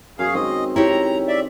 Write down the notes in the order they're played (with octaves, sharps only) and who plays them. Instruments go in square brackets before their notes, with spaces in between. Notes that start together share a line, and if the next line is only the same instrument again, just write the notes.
[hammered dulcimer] F#2 [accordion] G#4 F5
[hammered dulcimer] D#3 G#3 C4 [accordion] D#5
[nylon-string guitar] E4 G4 C#5 [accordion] A#5
[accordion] D5 E5